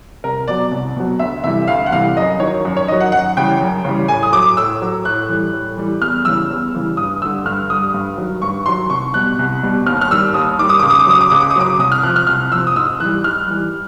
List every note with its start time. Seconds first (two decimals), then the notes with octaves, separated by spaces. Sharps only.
0.24 C2 A#4
0.48 B2 F#3 D5
0.71 C2
0.96 B2 F#3
1.19 D2 E5
1.44 C3 E3 G3 E5
1.62 E5
1.68 D2 F5
1.86 F#5
1.92 C3 E3 G3 F5
2.17 F#2 D#5
2.40 D#3 F#3 C#5
2.65 F#2
2.77 C#5
2.88 D#3 F#3 D#5
3.00 F#5
3.12 F#2 F#5
3.37 C#3 E3 G3 G5
3.61 F#2
3.85 C#3 E3 G3
4.08 A2 G#5
4.23 D#6
4.32 F#3 D6
4.57 A2 E6
4.82 F#3
5.05 A2 F#6
5.29 E3 G3
5.53 A2
5.77 E3 G3
6.02 E2 F6
6.25 C#3 E3 G3 E6
6.50 E2
6.74 C#3 E3 G3
6.97 G2 D#6
7.22 D3 G3 E6
7.45 G2 F6
7.70 D3 G3 D#6
7.94 G2
8.18 D#3 F#3
8.42 G2 C#6
8.66 D#3 F#3 C6
8.90 C2 C#6
9.14 B2 G3 F#6
9.39 C2
9.63 B2 G3
9.86 D#2 F6
10.01 F6
10.11 D#3 G3 E6
10.34 D#2 D#6
10.59 D#3 G3 D6
10.69 D#6
10.79 C#2 D6
10.90 D#6
10.99 D6
11.07 C#3 F#3 D#6
11.21 D6
11.30 C#2 D#6
11.41 D6
11.51 D#6
11.56 C#3 F#3 D6
11.79 C2 D#6
11.92 F6
12.03 C3 F3 F#6
12.16 F6
12.27 C2 F6
12.51 F3 E6
12.55 C3
12.67 D#6
12.75 G#2 E6
13.00 E3 F#6
13.04 G3
13.24 G#2 F6
13.47 E3 G3